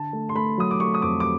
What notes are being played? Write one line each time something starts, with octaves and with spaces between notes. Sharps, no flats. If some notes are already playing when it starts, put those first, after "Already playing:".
Already playing: D3 A5
A3
C6
A3 B5
F#3 D#6
D6
A3 C#6
D#6
F2 D6
D6